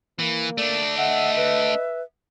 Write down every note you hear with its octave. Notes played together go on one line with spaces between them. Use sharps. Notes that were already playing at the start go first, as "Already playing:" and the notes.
E3 A#3
A3 D4 D5
D#5 E5 F#5
B4